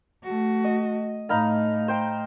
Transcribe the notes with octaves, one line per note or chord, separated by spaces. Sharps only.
A3 F#4
D#5
A2 D#4 F5 B5
C5 G5